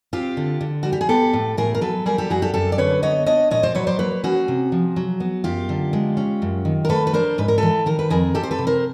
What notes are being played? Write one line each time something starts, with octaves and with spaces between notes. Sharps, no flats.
C4 F4 G4
D3
D3
G3 F#4
G4
G#4
B3 G4 A4
A2
A2 G#4 A#4
A#4
F#3 A4 B4
G3 G#4 A#4
G4 A4
F#2 F#4 G#4
G4 A4
F#2 G4 A4
D5
D3 B4 C#5
B3 C#5 D#5
D4 C#5 D#5
A#2 C#5 D#5
C5 D5
F#3 B4 C#5
C5 D5
A#3 B4 C#5
C#4 F#4 G#4
C3
F3
F#3
B3
F#2 F4 G4
D3
G#3
C#4
F#2
D#3
A#4
A3 A4 B4
B4
D4 A#4 C5
G#2 B4
A#4
E3 A4 B4
D#3 A#4
B4
F2 G#4 A#4
F2 G4 A4
C5
A4 B4
C3
A#4 C5